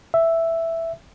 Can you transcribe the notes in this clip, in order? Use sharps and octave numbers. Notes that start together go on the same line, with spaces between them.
E5